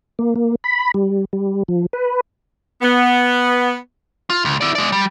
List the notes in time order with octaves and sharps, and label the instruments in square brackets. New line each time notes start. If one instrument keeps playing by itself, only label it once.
[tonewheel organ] A#3
A#3
B5
G3
G3
F3
B4
[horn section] B3
[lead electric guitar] F4
C#2
E4 D5
G#3 D5
G3